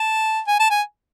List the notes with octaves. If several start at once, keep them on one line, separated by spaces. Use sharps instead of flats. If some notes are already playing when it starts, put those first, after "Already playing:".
Already playing: A5
G#5
A5
G#5